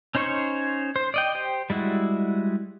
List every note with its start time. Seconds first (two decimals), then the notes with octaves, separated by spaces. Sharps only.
0.15 C#4 D#4 C5 C#5 C#6
0.96 C5
1.14 D5 D#5 G5
1.35 G4 C5 G5
1.70 G3 G#3 E4 F#4